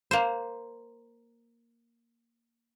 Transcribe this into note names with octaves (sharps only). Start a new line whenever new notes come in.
A#3 C5